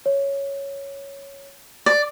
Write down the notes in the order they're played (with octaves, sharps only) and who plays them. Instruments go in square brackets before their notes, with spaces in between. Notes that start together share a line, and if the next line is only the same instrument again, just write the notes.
[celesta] C#5
[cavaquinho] D5